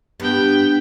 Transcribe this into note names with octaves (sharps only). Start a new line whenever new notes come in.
G2 B3 G5